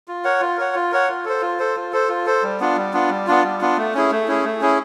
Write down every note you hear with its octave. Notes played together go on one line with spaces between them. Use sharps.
F4
A#4 C#5 F#5
F4
A#4 C#5 F#5
F4
A#4 C#5 F#5
F4
A4 C5
F4
A4 C5
F4
A4 C5
F4
A4 C5
G3
B3 D4 F4
G3
B3 D4 F4
G3
B3 D4 F4
G3
B3 D4 F4
A3
C#4 E4 G#4
A3
C#4 E4 G#4
A3
C#4 E4 G#4